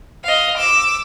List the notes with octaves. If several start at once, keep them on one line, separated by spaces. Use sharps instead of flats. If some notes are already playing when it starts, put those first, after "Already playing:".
D#5 F5
D6 E6